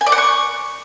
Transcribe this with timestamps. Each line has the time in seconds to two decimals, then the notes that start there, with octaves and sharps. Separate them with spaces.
0.01 G#5
0.06 D5
0.12 F#5
0.18 C#6